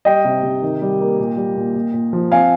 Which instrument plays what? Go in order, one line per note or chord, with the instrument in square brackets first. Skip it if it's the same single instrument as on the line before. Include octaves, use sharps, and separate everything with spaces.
[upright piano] G3 D#5 G5
C3
C3
D#3
G3
A#3
A#2
G3
A#2
A#2
A#2
F3
C4 F5 G#5